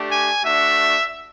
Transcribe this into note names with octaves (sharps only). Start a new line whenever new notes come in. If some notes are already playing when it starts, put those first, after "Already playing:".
Already playing: A3 D4 G4
G#5
A3 D4 F#4 E5